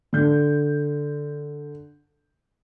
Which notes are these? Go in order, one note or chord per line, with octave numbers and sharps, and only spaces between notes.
D3 G6